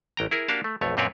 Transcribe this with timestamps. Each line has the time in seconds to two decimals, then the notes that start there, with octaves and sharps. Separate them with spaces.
0.17 A1 G5 A#5
0.31 E4 G#4 A#4
0.48 A#3 D4 F#4 G4 F5 A5
0.64 A3
0.81 B1 F2 A3 C#5
0.97 F#2 A#2 C4 B4 C#5 D5